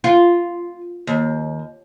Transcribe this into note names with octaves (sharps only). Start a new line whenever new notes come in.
F4
D#2